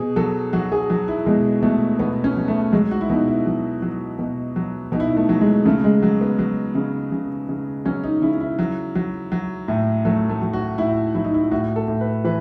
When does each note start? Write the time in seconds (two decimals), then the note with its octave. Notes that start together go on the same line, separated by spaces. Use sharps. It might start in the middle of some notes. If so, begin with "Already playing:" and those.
Already playing: B2 G#4
0.16 F#3 A4
0.53 F#3 F#4
0.72 G#4
0.90 F#3
1.08 E4
1.26 B2 G#3
1.63 B2 A3
1.99 B2 B3
2.24 C#4
2.36 F#3
2.48 A3
2.73 F#3 G#3
2.91 F#4
3.01 E4
3.09 B2 D#4
3.28 E4
3.46 F#3
3.82 F#3
4.19 B2
4.56 F#3
4.92 B2 D#4
5.00 E4
5.08 D#4
5.17 A3
5.29 F#3
5.41 G#3
5.65 C#3 A3
5.84 G#3
6.03 F#3
6.21 B3
6.39 F#3
6.75 C#3
7.12 C#3
7.49 C#3
7.85 F#3 C#4
8.04 D#4
8.22 C#3 E4
8.40 E4
8.59 F#3
8.95 F#3
9.32 F#3
9.68 A2
10.05 F#3 A3
10.29 A3
10.42 F#3
10.53 F#4
10.78 A2 E4
11.15 F#3 E4
11.24 D#4
11.34 E4
11.51 A2 F#4
11.76 A4
11.88 A2
12.01 B4
12.24 E3 B4